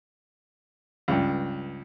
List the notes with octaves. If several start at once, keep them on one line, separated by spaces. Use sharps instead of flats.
C#2 G2